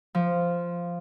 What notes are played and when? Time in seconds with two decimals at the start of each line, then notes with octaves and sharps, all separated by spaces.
0.15 F3